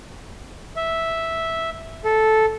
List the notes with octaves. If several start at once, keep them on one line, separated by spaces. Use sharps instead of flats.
E5
A4